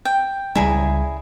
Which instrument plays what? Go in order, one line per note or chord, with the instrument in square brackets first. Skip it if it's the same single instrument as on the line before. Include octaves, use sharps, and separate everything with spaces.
[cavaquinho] G5
[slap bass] C#2 C#3 G3 [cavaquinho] E4 G#4 A#5